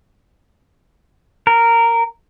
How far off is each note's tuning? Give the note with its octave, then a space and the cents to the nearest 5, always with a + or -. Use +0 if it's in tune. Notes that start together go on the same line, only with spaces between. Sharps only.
A#4 -10